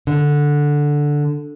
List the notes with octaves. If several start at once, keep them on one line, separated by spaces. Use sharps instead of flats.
D3